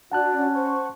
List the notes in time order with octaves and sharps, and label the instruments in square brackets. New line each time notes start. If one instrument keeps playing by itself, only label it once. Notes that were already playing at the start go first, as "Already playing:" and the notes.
[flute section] D4 F#4 [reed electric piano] F#5 A5 F#6
[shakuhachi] C#4
[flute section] C5 C#6